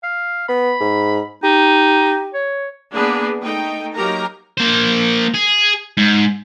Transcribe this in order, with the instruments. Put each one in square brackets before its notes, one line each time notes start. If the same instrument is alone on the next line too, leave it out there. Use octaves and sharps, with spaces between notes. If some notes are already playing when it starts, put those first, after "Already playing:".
[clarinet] F5
[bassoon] B3 [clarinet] B5
[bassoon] G#2
[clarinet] D#4 [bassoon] G4
[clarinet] C#5
[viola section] A#3 B3 D4 G#4
A3 D#4 G5
F#3 A#3 D#4 G4 A#4 A#5
[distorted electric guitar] A#3 C5
G#4
G#2